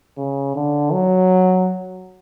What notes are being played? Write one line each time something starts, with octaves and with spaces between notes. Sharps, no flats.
C#3
D3
F#3